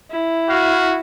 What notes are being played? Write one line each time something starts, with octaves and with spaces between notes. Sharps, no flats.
E4
F#4 F5